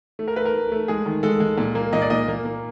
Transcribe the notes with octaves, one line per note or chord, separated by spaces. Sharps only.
A3
A#4
A3 B4
A#4
A3
A3
G#3 G#4
D#3
G#3 A4
G#3
A#2
A#3
A#2 D#5
D5
A#2 D#5
A#3
A#3